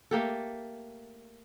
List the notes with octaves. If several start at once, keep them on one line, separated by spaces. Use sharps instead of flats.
A3 A#3 G4 A4